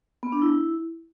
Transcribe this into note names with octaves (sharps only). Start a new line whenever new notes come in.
B3
D4
E4